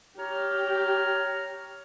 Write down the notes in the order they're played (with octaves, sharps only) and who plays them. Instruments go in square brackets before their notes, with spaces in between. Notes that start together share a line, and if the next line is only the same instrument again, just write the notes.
[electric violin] G4 [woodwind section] C#5 A#5 F6